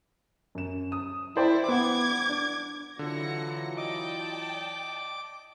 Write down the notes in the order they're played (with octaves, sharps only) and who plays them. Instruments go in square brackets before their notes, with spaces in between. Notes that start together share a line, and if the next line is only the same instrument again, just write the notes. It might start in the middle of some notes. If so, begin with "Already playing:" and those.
[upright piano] F#2 E7
D#6
[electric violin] E4 [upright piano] C5 D5 G5
[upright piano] B3 F#5 [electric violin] D6 G#6
[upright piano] D4
[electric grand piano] D3 [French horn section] E3 F#3 F4 [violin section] F#4 A#6 C#7
[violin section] D5 G5 A5 [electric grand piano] D#5 [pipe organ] D6